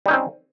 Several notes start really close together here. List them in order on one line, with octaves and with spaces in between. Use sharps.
G3 D#4 C#4 C4